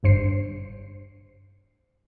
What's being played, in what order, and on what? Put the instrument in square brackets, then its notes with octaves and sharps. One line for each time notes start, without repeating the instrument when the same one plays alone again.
[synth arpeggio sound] G1 G2 C5 C7